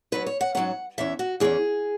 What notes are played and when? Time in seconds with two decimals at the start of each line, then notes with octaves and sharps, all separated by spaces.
0.12 G#2 F#3 C#4 B4
0.27 C#5
0.41 F#5
0.55 G#2 F#3 C#4 F#5
0.98 E2 E3 C#4 E5
1.19 F#4
1.40 E2 E3 C#4 G#4